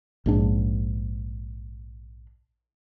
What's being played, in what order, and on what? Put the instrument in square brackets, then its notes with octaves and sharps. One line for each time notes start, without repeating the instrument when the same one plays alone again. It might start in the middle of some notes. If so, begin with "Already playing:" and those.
[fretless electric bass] A#1 G#2 D4